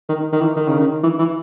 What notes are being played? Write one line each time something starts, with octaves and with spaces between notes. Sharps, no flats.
D#3
D#3
E3
D#3
C#3
D#3
E3
E3